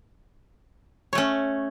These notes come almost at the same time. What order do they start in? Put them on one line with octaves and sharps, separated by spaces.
C#5 A3 C#4